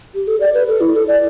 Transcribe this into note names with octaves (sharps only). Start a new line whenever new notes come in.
G4
A4
D5
B4
A4
E4
A4
D5